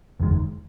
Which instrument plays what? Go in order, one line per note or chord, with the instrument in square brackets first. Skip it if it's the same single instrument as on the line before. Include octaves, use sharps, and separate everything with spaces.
[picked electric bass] F#1 E2 D#3 G#3